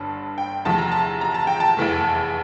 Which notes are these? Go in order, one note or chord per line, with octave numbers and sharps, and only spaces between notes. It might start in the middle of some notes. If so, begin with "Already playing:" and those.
Already playing: G1 G2 D3 A5
G5
E2 C3 F3 A3 A5
A#5
A5
A#5
A5
G5
A5
F1 E2 E3 A3